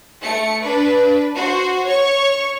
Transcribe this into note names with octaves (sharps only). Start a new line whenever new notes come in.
A3 C#7
D4 B4
F#4 C5
C#5 C#6